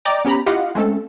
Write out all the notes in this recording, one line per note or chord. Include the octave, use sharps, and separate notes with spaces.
D5 D#5 G5 A#5 D6
B3 C#4 G4 A#5 B5
E4 F4 G4 D#5 F5 F#5
G#3 A3 C4 C#4 A4